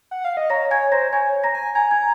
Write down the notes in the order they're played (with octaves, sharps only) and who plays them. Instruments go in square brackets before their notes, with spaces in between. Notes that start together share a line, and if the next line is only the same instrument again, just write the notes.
[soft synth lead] F#5
F5
D#5
[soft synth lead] C#5 [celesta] A#5 A#6
[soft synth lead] C#5 [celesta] G#5 G#6
[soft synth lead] C5 [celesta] A#5 A#6
[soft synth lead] C#5 [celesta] G#5 G#6
[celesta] A#5 A#6
[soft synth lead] G#5
[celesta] G#5 G#6 [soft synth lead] A#5
[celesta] G#5 G#6